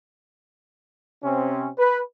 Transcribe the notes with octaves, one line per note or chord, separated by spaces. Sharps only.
C3 C4 C#4
B4